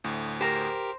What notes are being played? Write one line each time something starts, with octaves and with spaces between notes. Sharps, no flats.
D2 A2
G4 A#4 C5 A#5